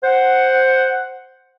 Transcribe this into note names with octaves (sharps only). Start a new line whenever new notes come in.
C5 F#5